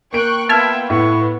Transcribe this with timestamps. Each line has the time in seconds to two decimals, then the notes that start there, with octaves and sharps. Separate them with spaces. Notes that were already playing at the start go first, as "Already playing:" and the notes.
0.13 A#3 G5 C#6 F#6 D7
0.49 B3 F4 E5 G5 A5 F6 G#6
0.90 A2 B3 C#6